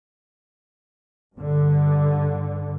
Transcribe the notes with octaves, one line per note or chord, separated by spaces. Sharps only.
G2 D3